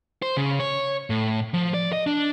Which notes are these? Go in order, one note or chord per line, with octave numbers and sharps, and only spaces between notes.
C5
C#3
C#5
A2
F3
D5
D#5
D4